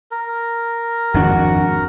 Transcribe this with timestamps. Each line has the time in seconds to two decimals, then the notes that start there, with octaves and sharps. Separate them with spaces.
0.11 A#4
1.14 G#1 F2 D4 F#4